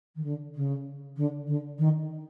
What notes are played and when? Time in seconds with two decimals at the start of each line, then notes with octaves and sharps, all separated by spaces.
0.15 D#3
0.23 D3
0.54 C#3
1.16 D3
1.46 D3
1.78 D#3